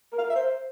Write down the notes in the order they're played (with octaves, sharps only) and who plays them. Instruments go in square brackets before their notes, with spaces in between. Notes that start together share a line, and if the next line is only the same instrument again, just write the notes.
[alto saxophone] A#4
F5
A#4
E5
C5